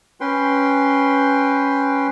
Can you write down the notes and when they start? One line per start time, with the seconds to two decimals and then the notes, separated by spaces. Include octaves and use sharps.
0.21 C#4 B4 G5 C6